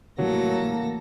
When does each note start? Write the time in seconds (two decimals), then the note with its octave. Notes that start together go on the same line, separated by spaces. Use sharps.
0.18 A2 C#3 E3 F#3 G3 A#3 A4 A#6